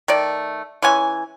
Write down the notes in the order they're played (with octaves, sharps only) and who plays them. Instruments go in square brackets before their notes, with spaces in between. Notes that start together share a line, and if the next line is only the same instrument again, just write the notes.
[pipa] D#3 A3 D5
E3 G#3 C#4 G#5